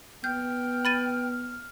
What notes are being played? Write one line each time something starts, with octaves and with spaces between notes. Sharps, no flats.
B3 G5 F6 G6
B5 A6 D#7